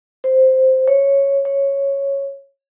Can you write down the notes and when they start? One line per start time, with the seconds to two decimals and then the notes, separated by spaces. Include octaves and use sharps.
0.24 C5
0.88 C#5
1.45 C#5